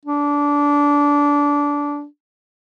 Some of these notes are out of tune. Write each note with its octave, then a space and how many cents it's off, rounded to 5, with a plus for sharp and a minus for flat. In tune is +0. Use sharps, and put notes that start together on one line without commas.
D4 -20